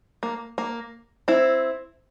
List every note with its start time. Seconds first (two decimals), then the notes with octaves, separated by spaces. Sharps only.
0.23 A#3
0.58 A#3
1.28 C4 E4